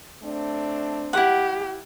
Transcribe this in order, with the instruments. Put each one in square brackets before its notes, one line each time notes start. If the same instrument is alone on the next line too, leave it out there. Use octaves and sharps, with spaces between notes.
[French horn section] A3 C4 D4
[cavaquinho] E4 F#5 [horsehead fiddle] G4